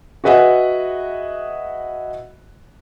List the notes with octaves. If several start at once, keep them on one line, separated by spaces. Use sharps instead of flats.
F#4 G#4 B4 D#5 E5 F#5